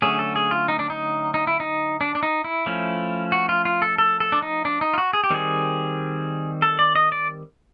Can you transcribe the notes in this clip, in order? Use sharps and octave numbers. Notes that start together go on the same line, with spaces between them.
D3 F#3 A3 C#4 G#4
A4
G#4
F4
D#4
D4
D#4
D#4
E4
D#4
D4
D4
D#4
E4
F3 A3 C#4
F#4
F4
F4
A4
A4
A4
D4
D#4
D4
D#4
F4
F#4
G#4
G4
D#3 G3 C4 G#4
A4
D5
D#5
D5